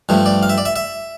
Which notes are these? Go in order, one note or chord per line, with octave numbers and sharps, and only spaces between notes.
G2 F3 A3
D5
F5
E5
D5
E5
E5